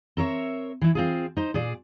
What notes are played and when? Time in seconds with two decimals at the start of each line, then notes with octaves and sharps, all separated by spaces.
0.17 C4 A#4 C#5 E5
0.81 E3 E4
0.95 C4 F4 G#4
1.37 D#4 C5
1.54 A#2 G#4 D5